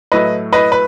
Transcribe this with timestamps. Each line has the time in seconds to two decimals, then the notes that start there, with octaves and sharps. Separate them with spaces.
0.12 A2 F#3 A3 E4 B4 D#5
0.53 B4 D#5
0.72 B4